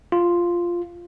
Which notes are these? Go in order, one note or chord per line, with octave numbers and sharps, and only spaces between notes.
F4